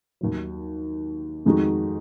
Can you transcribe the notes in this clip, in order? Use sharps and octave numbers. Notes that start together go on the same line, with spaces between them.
D#2 D#3 F#3
F2 D#3 G#3 D#4 F#4